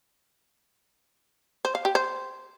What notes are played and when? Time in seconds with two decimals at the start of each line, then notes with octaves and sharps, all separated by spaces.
1.65 C5
1.75 F5
1.85 G4
1.95 C5